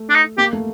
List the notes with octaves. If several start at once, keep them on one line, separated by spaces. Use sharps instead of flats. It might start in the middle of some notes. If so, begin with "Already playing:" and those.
Already playing: A3
D4
D#4
A#3 G4
A3